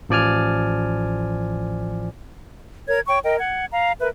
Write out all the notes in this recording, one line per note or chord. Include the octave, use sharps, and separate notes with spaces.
A1 F3 D5 G#5 F6
A#4 C#5 G#6
C#5 G5 C#6
A#4 D#5 G5
F#5 G#6
F5 A#5
A#4 B4 E5